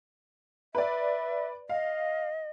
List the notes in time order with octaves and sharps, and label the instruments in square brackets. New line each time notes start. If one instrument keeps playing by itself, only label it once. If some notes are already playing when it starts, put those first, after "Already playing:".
[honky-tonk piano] B4 D5 [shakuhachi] E5
[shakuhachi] D#5 [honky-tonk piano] F5